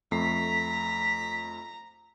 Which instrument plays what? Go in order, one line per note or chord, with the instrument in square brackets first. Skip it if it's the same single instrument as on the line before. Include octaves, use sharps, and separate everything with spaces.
[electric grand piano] F2 A3 C7 [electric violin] A#5 [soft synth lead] B6